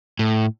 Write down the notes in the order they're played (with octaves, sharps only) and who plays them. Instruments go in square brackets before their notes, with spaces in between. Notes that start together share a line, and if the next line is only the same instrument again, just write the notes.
[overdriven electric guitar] A2